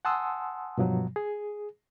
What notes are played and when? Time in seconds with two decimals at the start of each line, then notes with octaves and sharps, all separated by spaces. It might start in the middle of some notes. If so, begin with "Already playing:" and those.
0.05 F#5 G#5 A5 C6 D#6 E6
0.78 G2 B2 F3 F#3
1.16 G#4